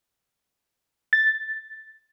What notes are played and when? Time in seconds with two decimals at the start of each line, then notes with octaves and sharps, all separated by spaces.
1.13 A6